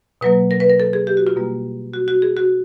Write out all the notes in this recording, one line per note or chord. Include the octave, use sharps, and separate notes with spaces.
B2 F#3 A#3 B4
A#4
B4
A#4
A4
G#4
G4
F#4
F4
B2 G3 A#3
F#4
F#4
G#4
F#4